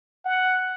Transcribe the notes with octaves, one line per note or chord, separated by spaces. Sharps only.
F#5